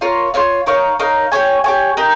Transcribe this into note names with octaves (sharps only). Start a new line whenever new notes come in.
F4 A#4 C#5 F5
F4 A#4 C#5 F5
D#4 A#4 C#5 F5
D#4 A#4 C#5 F5
G4 C#5 G#5
G4 C#5 G#5
A#3 D#4 G4